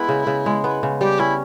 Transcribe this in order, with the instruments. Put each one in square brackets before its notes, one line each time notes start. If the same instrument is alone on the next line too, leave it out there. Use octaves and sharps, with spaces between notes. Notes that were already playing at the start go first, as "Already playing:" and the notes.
Already playing: [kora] G#3 B3 [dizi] E4
[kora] C#3
C#3
G#3
B3
C#3
[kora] G3 [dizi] G4
[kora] C#4 [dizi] E4